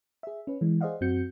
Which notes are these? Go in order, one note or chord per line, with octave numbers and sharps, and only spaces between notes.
G#4 E5
C#4 B4
E3 G#3
G#4 C5 D5 D#5 F5 F#5
F#2 C4 F#4 G6 C#7